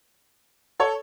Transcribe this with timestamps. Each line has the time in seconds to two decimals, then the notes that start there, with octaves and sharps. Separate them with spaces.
0.80 A4 C#5